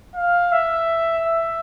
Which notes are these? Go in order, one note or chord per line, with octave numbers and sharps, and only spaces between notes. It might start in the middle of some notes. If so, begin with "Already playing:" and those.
F5
E5
E5